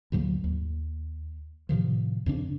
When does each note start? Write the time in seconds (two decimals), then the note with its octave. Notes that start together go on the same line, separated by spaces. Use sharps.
0.12 D2 G#2 F#3 A#3
0.44 D#2
1.69 A2 C3 D#3 F3
2.26 F2 C#3 D4